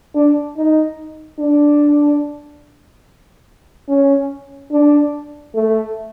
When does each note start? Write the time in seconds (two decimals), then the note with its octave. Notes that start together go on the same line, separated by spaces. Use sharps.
0.15 D4
0.57 D#4
1.39 D4
3.88 C#4
4.71 D4
5.54 A3